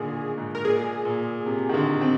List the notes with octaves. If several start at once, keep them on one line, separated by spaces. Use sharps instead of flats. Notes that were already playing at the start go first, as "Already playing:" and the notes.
Already playing: A#2 D3 D#3 G#4
G#2
A#4
A#2 G#4
A#2
C3
D#3
D3
C4